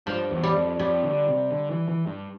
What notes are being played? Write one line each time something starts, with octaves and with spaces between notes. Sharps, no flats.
G2 F3
E2
G3
F2
F2 G3
D3
C3
D3
E3
E3
G2